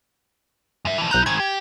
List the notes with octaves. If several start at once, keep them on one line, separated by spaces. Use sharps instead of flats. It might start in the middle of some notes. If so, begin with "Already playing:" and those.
F#2 E5
E3 F3
B1 E4 A#5 F#6 G6
G#2 D#3 G#6
G4